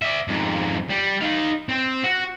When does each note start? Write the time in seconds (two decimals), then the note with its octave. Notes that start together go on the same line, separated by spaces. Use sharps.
0.02 D5 E5
0.28 F2 G#2
0.90 G3
1.21 D#4 F5
1.69 C4
2.03 F#4